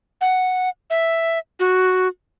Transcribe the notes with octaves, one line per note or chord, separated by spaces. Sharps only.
F#5
E5
F#4